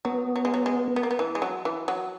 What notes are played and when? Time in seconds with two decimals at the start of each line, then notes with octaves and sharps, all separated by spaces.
0.05 F#3 B3
0.36 F#3
0.45 G#3
0.54 F#3
0.66 G#3
0.96 B3
1.03 A#3
1.11 B3
1.19 E3
1.35 G#3
1.42 F#3
1.65 E3
1.88 F#3